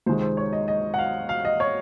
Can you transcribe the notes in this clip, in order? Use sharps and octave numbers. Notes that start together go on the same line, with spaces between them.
C#2 C3 D#3 G#3 C5
C5
C#5
D#5
D#5
F#5
F5
F5
D#5
C#5